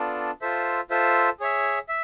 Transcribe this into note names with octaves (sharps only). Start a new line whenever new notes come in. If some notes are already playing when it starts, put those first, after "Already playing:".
Already playing: B3 D4 F4 A4 D5
F4 A4 C5 E5
F4 A4 C5 E5
G#4 C#5 E5
E5